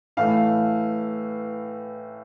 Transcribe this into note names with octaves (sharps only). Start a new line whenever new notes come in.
A2 E3 A3 F5